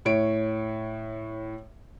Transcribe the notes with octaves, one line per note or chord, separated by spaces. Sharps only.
A2 C#5 D7